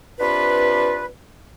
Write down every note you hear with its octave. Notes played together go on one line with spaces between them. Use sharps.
C3 D4 F4 B4